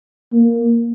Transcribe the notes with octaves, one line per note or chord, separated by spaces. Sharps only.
A#3